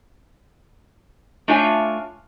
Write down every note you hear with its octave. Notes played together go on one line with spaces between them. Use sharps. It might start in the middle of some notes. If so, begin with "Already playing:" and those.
A3 D4 F4 C#5 E5 G#5